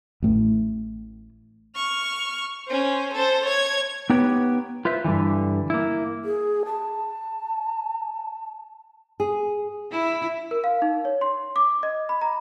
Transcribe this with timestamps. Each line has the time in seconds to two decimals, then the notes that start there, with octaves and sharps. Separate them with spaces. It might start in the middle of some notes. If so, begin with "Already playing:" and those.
0.22 A1 A2 E3
1.76 C#6 F6
2.68 C#4 C5
3.13 A4 C5
3.45 C#5 G#6
4.10 B3 D#4 G4 B4 C#5
4.85 F4 B4 C5 E5
5.04 G2 A#2 D3 E3
5.70 A#3 E4
6.25 G#4
6.66 A5
9.20 G#4
9.91 E4
10.51 A#4
10.64 F5
10.82 D#4
11.05 C#5
11.21 C6
11.56 D6
11.83 D#5
12.09 B5
12.22 A#5